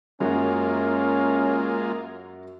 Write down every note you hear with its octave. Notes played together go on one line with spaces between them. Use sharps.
F#2 G#3 A#3 C#4 F4 F#4